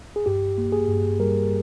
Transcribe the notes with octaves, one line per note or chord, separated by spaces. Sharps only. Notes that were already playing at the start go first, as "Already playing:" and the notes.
G#4
G2 G4
A#3
G#4
G2
G3 A#4